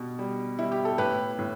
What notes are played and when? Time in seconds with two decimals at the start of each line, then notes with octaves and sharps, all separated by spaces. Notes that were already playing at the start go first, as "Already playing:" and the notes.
Already playing: B2 G3
0.19 G3
0.58 G3 E4
0.72 G4
0.85 A4
0.98 A2 G4 B4
1.39 A2